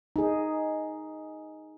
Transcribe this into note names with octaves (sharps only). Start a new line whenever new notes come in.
D#4 G#4